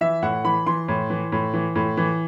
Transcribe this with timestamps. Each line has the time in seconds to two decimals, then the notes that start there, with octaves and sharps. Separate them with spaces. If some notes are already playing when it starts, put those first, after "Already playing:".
0.01 E3 E5
0.22 A2 F#5
0.45 E3 B5
0.66 E3 C6
0.88 A2
1.10 E3
1.32 A2
1.53 E3
1.75 A2
1.97 E3